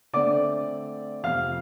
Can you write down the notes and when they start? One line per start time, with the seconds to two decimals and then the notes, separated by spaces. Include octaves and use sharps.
0.13 D3 A3 C4 D5 D6
1.24 F2 C3 F3 F5 F6